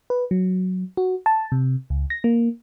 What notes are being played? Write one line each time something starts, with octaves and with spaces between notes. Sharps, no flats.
B4
F#3
F#4
A5
C3
C#2
A#6
A#3